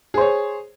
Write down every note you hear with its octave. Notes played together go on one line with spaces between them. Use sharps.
G#4 C5 C#5